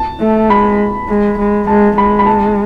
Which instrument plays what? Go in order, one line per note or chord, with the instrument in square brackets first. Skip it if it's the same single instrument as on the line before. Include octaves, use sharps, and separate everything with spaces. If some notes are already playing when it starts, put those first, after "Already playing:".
Already playing: [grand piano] A5
[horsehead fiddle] A3
[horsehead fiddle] G#3 [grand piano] B5
[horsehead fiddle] G#3
G#3
[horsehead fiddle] G#3 [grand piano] A5
[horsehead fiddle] G#3 [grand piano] B5
[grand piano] B5
A5